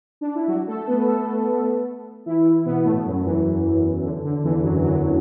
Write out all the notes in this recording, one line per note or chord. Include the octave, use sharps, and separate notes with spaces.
D4
E4
F#3 F#4
A3 A4
B3 B4
A3 A4
E3 E4
B2 B3
A2 A3
F#2 F#3
E2 E3
D3
D3
E2 E3
F#2 F#3
F#2 F#3
F#3